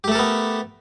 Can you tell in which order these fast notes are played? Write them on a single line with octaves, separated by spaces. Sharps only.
G4 A3 A4 A#4 B3